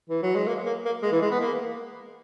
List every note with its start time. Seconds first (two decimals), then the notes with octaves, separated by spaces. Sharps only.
0.10 E3
0.23 F#3
0.35 G#3
0.47 A#3
0.66 A#3
0.85 A#3
1.03 G#3
1.12 E3
1.21 G#3
1.31 B3
1.40 A#3